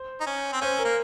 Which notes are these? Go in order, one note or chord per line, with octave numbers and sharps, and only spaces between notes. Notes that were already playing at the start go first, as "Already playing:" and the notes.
Already playing: C5
D#4
C#4
C4
C#4 C5
A#4
A#3